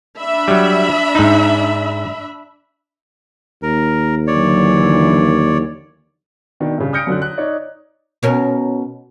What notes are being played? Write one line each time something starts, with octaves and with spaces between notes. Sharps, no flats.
D4 E5 B5
F#3 G3
G#2 D#4
D#2 A#4
D3 E3 F#3 C#5 D5
B2 D#3 D4
G2 C#3
D#6 F6 G6 A#6 C#7 D7
F#2 D3 F#3 F#6
F#6
D#4 C#5 D5
B2 C#4 A#4